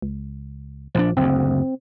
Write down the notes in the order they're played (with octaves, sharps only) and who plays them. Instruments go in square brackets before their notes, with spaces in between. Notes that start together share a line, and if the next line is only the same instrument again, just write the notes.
[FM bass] C#2
[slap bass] A#1 D3 D4 [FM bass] F3
[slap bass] F#1 D2 [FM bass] C4